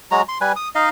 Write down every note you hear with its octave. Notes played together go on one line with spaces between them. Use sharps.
F#3 G#3 F#4 A#5
C6
G3 B4 G#5
D#6
D#4 D#5 F5